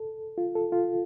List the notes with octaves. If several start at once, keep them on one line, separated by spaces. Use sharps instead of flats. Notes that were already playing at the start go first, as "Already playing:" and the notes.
Already playing: A4
F4
A4
F4